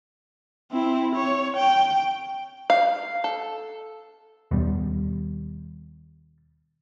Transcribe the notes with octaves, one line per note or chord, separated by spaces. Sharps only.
C4 E4
C#5
G5
F5
A4
D#2 B2 G3